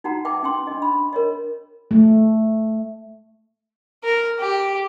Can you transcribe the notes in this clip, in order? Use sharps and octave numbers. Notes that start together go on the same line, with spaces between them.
D#4 F#4 F#5 A#5
B4 E5 G5 A5 D6
C#4 G5 C6
D4 D#5
B5
A#4 C#5 D#5
A3
A#4
G4